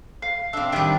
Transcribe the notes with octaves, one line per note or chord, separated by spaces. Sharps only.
F5
C4 D4 E5 F5
D#3 G3 D4 G4 F#6